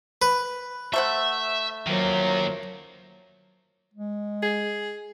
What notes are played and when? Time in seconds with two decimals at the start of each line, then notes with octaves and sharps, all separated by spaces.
0.22 B4
0.94 A3 C5 E5 F#5
1.87 F#2 D#3 F3 F#3 A#3
3.94 G#3
4.43 G#4